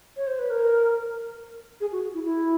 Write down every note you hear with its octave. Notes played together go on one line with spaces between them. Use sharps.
C#5
C5
B4
A#4
G#4
F#4
E4
E4